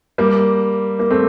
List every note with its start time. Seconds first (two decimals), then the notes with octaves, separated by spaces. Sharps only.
0.18 G3 A#3
0.99 A#3
1.10 A3 C4